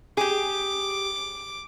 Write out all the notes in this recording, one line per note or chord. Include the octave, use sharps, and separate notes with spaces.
G4 G#4 D6